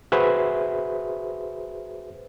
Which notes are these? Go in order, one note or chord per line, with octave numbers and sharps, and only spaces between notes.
F#4 G#4 B4 C5 E5